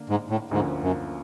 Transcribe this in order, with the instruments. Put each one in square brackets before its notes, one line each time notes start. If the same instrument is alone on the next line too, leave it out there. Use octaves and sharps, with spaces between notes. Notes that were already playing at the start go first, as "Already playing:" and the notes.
Already playing: [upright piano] D3 A#3 D4
[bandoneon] G#2
A2
[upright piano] D2 D3 F3 A#3 C#4 [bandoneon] G#2
[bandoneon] F#2